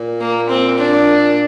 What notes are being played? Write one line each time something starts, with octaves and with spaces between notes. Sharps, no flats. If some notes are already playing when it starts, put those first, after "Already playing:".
Already playing: A#2
A#3
C4
D4